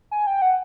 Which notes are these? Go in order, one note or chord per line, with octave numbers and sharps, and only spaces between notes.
G#5
G5
F#5